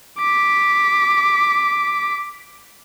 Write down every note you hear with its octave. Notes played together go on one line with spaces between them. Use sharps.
D6 B6